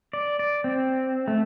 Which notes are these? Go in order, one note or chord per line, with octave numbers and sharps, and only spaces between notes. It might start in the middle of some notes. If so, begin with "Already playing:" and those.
D5
D5
C4
A3